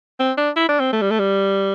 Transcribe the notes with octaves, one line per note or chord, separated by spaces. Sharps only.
C4
D4
E4
D4
C4
A3
G3
A3
G3